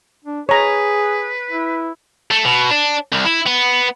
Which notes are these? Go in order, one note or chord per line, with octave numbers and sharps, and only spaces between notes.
D4
G#4 B4 C#5 A#5
E4
A3
B2
D4
C2
E4
B3